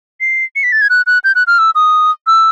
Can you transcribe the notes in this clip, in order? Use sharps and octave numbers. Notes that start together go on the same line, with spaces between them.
C7
C#7
B6
A6
G#6
F#6
F#6
G6
F#6
F6
E6
D#6
E6